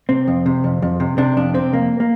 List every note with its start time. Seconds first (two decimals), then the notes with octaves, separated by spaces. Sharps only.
0.09 C3 C4
0.27 F2
0.46 C3
0.64 F2
0.82 F2
1.00 C3
1.18 C3 D4
1.37 F2 D4
1.54 C3 C4
1.73 F2 A#3
2.00 A#3